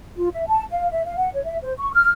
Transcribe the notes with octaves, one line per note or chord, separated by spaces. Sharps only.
F4
E5
A5
F5
E5
F5
F#5
C#5
E5
C5
C#6
F6